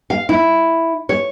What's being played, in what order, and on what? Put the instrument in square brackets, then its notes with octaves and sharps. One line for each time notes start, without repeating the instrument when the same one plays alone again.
[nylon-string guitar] F5
E4
C#5